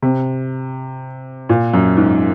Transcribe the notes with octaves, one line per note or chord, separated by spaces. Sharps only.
C3
A#2
F#2
G#2